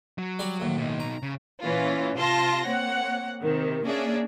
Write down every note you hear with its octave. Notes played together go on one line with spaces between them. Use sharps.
F#3
G3 D5 B5
A#1 D#2 A2
B2 D#4
A#5
C#3
A#2 E3 C#4 F4
C3 F4 A5 C6 A#6
A#3 C4 C#5 F#5
C3 D#3
A#3 C#4 D4 G#4 D5 E5